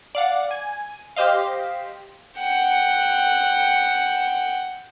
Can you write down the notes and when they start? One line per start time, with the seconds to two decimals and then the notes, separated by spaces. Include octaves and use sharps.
0.15 D5 F5 F#5
0.51 G#5
1.16 G4 C5 D#5 F5
2.39 F#5 G5